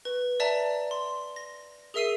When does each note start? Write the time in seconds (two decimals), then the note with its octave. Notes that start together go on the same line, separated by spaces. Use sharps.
0.05 B4
0.40 D5 E5 A5 A#5
0.91 C6
1.36 A#6
1.94 G#4 A#4 E5 E6 C7 D#7